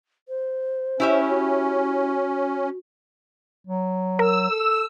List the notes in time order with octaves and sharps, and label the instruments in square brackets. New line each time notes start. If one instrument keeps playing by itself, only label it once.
[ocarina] C5
[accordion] C#4 [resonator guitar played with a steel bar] E4 G4 E5
[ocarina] F#4
[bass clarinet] F#3
[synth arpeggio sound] A#4 [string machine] E6
[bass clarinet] A4